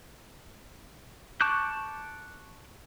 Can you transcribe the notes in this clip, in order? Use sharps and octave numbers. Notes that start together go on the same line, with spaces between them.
A5 C#6 D6 F#6 G6